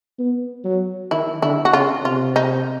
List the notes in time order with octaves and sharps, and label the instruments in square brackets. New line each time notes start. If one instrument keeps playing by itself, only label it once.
[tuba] B3
F#3
[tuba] D#3 [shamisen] E4
[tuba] D3 [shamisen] E4
[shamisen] F#4
[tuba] C#3 [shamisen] F4
[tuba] C3 [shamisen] F4
[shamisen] D#4